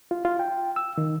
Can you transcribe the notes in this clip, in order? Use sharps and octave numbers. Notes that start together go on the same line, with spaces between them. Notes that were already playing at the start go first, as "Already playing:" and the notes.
F4
F4
G5
E6
D#3